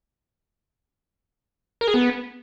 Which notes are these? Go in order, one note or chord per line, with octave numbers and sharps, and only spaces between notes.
A#4
G#4
B3